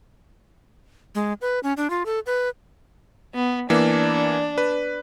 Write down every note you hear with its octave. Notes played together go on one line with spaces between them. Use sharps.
G#3
B4
C#4
D4
F4
A4
B4
B3
E3 A#3 B3 D4
B4